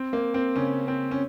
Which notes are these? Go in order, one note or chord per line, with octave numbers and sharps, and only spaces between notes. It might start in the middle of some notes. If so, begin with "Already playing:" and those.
Already playing: C4
A#3
C4
C#3 C#4
C4
C#4